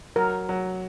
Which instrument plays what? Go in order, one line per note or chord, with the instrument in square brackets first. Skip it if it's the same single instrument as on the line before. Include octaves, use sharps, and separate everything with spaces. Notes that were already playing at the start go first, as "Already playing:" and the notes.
[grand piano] F#3 [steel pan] A#4
[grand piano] F#3